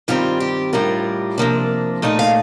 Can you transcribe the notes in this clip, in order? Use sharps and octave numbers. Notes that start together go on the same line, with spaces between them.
G2 D#3 G3 C4 F4
G4
A2 G3 D4 F4 A#4
C3 F3 A#3 D4
A#2 A3 D#4 D#5
F5